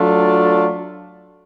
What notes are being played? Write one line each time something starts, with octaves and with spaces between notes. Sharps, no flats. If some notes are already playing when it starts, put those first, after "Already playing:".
Already playing: F#3 A3 D4 F4 A4